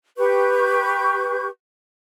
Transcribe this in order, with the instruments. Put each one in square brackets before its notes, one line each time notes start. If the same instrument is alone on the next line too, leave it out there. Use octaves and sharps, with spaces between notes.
[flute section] G4 B4 C#6 G6